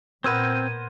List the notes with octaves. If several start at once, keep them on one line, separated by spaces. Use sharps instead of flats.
A#2 B3 C4 A#4 C5 E6 G#6 D#7